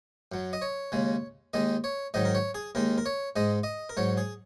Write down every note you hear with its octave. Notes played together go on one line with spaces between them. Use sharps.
F#2 F#3
D#5
C#5
D#2 C#3 G#3
D#2 D#3 G#3 D#5
C#5
G#2 D#3 F#3 D#5
A#4
C#5
G#4
D#2 D#3 G#3 A#4
A#4
C#5
G#2 G#3 D#5
D#5
A#4
G#2 F#3 C#5
G#4